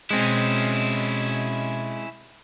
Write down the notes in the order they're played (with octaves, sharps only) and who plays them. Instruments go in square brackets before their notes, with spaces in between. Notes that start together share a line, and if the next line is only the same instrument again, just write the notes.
[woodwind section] B2 [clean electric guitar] G#3 C4 [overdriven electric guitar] C#4 E4